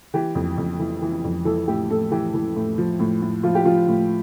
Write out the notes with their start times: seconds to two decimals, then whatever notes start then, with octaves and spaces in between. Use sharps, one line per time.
0.14 E3 G4
0.35 F2
0.58 F2
0.79 E3
1.02 E3
1.24 F2
1.45 E3 A4
1.68 A2 G4
1.90 A2 A4
2.11 E3 G4
2.34 E3
2.55 A2
2.78 F3
2.99 A2
3.22 A2
3.43 F3 F4
3.55 G4
3.65 F3 F4
3.88 A2